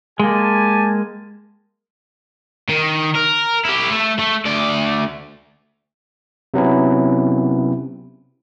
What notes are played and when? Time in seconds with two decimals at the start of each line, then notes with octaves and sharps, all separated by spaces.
0.20 G#3 A#3 G4 G#5 A5
2.69 D#3
3.15 A#4
3.65 E4 G4
3.91 A3
4.19 A3
4.45 D2 D5
6.54 C3 F#3 B3 C#4 E4